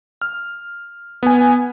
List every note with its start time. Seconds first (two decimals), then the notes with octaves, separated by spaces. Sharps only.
0.22 F6
1.23 B3 G#5